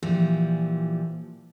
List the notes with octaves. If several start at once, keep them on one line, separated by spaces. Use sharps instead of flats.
A#2 E3 F3 G3